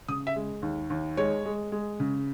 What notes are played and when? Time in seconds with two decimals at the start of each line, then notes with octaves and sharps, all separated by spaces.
0.08 C#3 D#6
0.27 E5
0.36 G#3
0.62 D#2
0.90 D#2
1.17 G#3 C#5
1.45 G#3
1.72 G#3
2.00 C#3